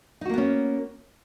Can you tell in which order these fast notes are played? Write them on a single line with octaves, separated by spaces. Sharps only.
D#4 F#4 A#3 B3 C#4